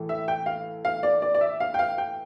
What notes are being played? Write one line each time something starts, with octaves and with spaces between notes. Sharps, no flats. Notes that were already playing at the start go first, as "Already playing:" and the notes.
Already playing: A2 E3 A3
E5
G5
F5
F5
D5
D5
D5
E5
F5
G5
F5
G5